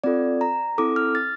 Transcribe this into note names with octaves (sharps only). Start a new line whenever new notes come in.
C4 F4 A4 D5
A#5
C4 E4 A4 D6
F6
A6